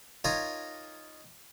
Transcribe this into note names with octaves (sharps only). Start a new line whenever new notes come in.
D#4 F4 A#4 C#5 G#5 A#5